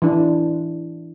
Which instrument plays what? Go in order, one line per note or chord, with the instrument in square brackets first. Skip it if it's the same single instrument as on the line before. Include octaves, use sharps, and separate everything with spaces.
[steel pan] E3 D4 E4